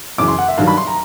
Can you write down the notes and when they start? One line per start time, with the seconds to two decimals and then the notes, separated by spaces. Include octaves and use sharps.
0.18 F#2 C#3 E3 D6
0.28 C6
0.38 F#5
0.48 E5
0.57 G2 D#3 F#3 F5
0.68 B5
0.77 C6
0.87 A#5